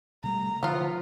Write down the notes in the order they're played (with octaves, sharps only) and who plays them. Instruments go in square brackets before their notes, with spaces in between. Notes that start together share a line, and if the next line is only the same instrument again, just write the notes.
[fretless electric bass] C3 G3 A3 [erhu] A#5
[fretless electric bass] D3 [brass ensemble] F3 [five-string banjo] B3 F4